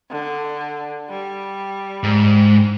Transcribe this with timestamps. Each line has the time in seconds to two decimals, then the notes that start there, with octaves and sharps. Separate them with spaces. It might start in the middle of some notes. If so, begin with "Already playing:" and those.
0.11 D3
1.10 G3
2.03 G#2